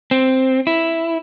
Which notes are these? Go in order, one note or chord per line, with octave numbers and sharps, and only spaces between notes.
C4
E4